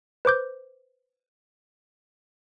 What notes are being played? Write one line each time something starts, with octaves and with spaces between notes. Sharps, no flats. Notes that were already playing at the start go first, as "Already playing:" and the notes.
B4 C5 D6 G6